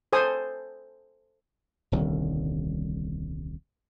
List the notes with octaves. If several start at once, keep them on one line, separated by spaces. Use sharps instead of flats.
A4 C5 G#5 D#6
D#1 C2 D3 D#3